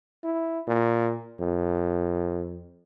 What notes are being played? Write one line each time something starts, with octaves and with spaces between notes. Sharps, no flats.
E4
A#2
F2